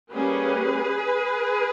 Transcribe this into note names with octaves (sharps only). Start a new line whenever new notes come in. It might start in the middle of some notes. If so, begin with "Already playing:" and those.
G3 A#3 C#4 G#4 B4